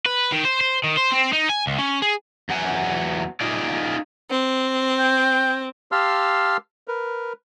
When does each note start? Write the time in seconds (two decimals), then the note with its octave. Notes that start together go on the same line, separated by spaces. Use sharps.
0.06 B4
0.32 D#3
0.44 C5
0.61 C5
0.84 D#3
0.97 C5
1.12 C4
1.33 D#4
1.50 G#5
1.67 C#2
1.79 C#4
2.02 G#4
2.49 E2 F#3 F#5 G#5
3.41 D#4 F4 G#4 D5
4.30 C4
4.99 G5
5.92 G4 F5 A5 C6 E6 F6
6.88 A#4 B4